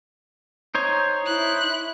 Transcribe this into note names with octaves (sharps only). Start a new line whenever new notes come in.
D#4 C5 C#5
E4 F#6